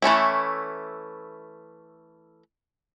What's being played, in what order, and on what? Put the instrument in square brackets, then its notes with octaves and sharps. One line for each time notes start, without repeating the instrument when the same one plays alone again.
[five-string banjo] E3 A3 C#4 E4